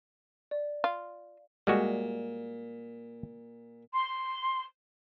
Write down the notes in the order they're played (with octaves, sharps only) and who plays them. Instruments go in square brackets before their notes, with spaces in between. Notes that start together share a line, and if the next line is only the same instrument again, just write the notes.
[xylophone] D5
[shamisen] F4
[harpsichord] A#2 [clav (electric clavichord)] G3 G#3 F#4
[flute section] C6